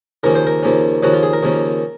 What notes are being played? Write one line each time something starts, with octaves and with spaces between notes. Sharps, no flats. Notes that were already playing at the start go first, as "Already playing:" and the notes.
D#2 C#3 F3 A#3 C#4 A#4
C5
A#4
D#2 C#3 F3 A#3 C#4
D#2 C#3 F3 A#3 C#4 F#4
F4
G#4
A#4
D#2 C#3 F3 A#3 C#4